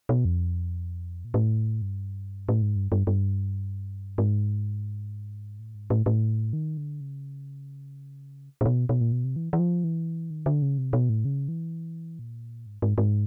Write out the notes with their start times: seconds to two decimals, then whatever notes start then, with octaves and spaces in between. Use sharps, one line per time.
0.09 B2
0.25 F2
1.25 A#2
1.34 A2
1.82 G2
2.49 A2
2.62 G#2
2.76 G2
2.92 G2
3.07 G2
4.18 G#2
5.59 A2
5.75 G#2
5.90 A2
6.06 A2
6.53 D#3
6.77 D3
7.01 C#3
8.61 A#2
8.65 B2
8.89 B2
9.01 A#2
9.12 B2
9.24 C3
9.36 E3
9.53 E3
9.59 F3
9.84 E3
10.30 D#3
10.46 D3
10.62 C#3
10.78 C3
10.93 B2
11.09 A2
11.25 C#3
11.48 E3
12.19 A#2
12.66 G#2
12.82 G#2
12.98 G#2